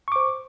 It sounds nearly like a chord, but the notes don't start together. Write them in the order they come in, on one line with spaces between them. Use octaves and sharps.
C#6 D6 C5